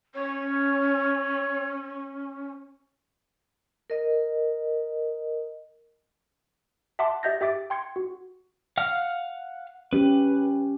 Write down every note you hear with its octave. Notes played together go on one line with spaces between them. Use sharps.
C#4 C#5
A#4 D#5
E5 F#5 A5 C6 D6
G4 D#5 E5 G6 A6 A#6
G4 E5 D6 A6 D7
G5 C6 G#6 C#7
F#4
F5 F#5 F6
C#4 G4 B4